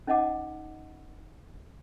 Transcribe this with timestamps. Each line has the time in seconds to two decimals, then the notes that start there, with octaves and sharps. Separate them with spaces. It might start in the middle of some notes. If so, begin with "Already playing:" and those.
0.07 C#4 D#4 D#5 F#5 A5 D6